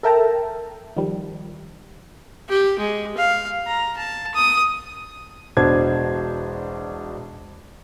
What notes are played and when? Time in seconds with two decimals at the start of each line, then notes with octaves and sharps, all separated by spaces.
0.03 A4 A#4 E5 G5 A5 A#5
0.96 D#3 F3 G3
2.49 G4
2.78 G#3
3.17 F5
3.67 A#5
3.97 A5
4.34 D#6
5.57 E1 B2 D4 C5 G#6